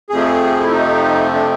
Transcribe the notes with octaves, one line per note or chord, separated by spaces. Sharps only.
F2 C3 F3 A3 G#4
E4
D#4
D4